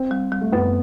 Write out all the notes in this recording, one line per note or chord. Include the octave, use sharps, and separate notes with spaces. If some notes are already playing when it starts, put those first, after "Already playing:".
Already playing: C4
G3
G3
A3
F#2 B3